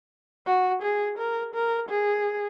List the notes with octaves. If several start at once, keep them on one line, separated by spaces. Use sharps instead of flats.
F#4
G#4
A#4
A#4
G#4